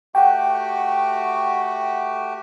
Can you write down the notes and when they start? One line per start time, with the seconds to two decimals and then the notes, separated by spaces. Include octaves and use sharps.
0.15 A3 F#4 G4 F#5 G5